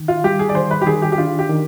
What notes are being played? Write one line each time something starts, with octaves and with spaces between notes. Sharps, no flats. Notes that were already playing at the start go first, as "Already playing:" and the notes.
Already playing: D#3
F4
G3 G4
G#4
D5
D#3 C5
B4
G4
D#3 G#4
G4
G4
D4 F4
G4
D#3